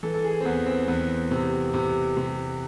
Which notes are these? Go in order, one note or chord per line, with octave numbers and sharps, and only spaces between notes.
E3 A4
A4
G#4
C4
E2 B3
C4
E2 B3
C3
C3
C3